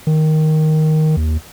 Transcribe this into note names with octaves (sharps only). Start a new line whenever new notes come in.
D#3
D#2